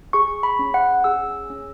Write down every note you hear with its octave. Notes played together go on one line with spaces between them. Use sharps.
G#4 C#6
B5
C#4
F#5
G#4 E6
C#4